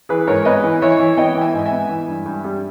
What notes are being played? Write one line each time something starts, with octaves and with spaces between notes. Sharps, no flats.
E3 G#4 B4
G#2 A#4 C#5
B3 B4 D#5
E3
E3 C#5 E5
E3
B3 D#5 G5
E3
E5 G#5
G#2
E5 G#5
B3
E3
G2
G2
G3